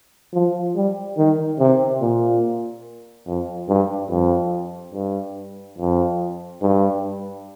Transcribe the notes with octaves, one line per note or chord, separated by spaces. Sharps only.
F3
G3
D#3
C3
A#2
F2
G2
F2
G2
F2
G2